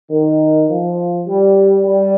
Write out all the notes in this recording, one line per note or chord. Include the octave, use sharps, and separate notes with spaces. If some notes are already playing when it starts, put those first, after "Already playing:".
D#3
F3
G3
G3